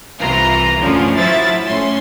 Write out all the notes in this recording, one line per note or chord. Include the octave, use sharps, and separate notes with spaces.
C2 C3 E3 F4 A#5
A1 F#2 A2 D3 F3 C#4
F3 F#3 E4 E5 A6
A2 C#4 C6